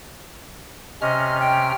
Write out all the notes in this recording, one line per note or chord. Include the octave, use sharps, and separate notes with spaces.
C3 C#4 D#5 F6
G5